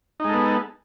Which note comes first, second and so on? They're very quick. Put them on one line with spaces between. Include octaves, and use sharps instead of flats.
D#4 G#3 A4 B3